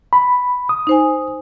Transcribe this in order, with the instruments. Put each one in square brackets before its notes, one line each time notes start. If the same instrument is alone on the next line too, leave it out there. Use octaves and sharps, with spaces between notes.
[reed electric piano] B5
D#6
[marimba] D#4 C5 G#5